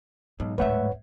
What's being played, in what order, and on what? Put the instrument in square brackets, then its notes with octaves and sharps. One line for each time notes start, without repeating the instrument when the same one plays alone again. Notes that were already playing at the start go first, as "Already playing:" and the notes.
[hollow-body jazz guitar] B1 [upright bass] G#2
[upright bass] D1 G#2 [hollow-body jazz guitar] B1 A3 E5 [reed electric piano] B4 C#5 F#5